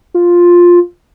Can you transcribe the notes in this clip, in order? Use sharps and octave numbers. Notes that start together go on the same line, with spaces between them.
F4